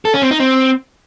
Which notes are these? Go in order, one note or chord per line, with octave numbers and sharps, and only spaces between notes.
A4
C#4
C4
D#4
C4